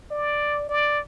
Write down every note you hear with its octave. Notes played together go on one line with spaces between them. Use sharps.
D5
D5